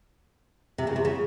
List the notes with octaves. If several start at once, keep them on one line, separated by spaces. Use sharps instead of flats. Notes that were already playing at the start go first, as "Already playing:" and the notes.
C3
C#3
C3
C#3